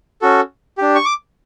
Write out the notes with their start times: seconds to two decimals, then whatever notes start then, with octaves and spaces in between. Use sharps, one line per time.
0.22 C#4 F#4 A4
0.78 D4 G4
0.95 C#6
1.05 D6